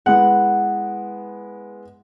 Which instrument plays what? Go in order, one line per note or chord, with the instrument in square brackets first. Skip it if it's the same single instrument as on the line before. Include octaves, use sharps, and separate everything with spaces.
[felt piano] G#3 B3 E4 [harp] F#5